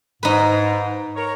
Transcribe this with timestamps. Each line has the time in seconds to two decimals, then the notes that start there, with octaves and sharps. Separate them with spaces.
0.23 G#2 D#4 B4
1.16 A#4 C#5